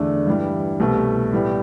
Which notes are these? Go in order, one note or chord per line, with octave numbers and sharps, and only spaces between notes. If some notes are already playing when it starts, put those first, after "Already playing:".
Already playing: E2 D3 A3 D4
G2 E3 G3
C2 B2 A3
A2 G3 B3